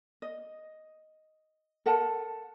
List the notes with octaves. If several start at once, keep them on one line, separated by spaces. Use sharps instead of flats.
D#5
A4 A#4 F#5 A5